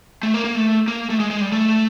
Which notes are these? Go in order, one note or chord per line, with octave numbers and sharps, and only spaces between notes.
A3
A#3
A#3
A3
A#3
A3
G#3
G#3
G3
A3